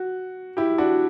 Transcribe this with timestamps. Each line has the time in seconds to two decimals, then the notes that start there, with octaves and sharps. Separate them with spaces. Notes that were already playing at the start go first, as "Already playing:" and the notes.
Already playing: F#4
0.57 E4 G4
0.78 D4 F#4